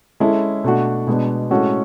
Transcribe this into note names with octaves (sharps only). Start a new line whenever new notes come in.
G#3 C#4 E4 A4
B2 A3 D4 F#4
B2 G#3 B3 D4
A2 G#3 C#4 F#4 A4